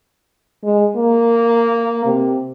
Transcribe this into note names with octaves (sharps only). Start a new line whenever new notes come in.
G#3
A#3
C3